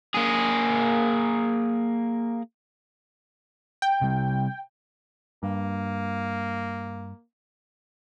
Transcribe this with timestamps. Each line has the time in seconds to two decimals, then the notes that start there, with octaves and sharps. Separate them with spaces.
0.15 A#3 G#4
3.82 G5
4.01 C3 G3
5.43 G2 A#3